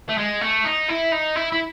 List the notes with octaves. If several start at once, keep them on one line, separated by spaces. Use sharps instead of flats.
A3
G#3
A3
D#4
E4
D#4
E4
E4